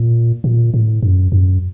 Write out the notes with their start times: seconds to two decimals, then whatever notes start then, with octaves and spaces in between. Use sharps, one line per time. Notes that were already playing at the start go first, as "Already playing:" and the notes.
Already playing: A#2
0.44 A#2
0.74 A2
1.03 F#2
1.32 F#2